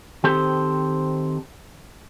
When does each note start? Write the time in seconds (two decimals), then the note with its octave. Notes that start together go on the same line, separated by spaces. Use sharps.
0.24 D#3 C4 G4 A4 C5